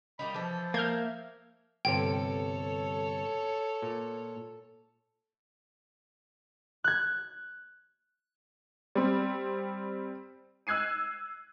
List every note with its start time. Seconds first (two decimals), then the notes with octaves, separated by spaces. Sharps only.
0.19 G3 A#3 D#4 B5
0.34 E3 F3 A4
0.74 A#3 E5 F5 F6 G6 G#6
1.85 G1 C3 A4 C#5 G5
3.82 A#2
6.84 F#6 G#6
8.95 G3 C4
10.67 E6 F#6 G#6 C7 D#7